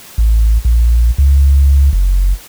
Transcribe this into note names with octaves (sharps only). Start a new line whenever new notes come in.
A1
A#1
C#2
F#1